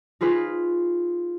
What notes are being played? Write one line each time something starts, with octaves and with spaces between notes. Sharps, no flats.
D#4 F4 G#4 B4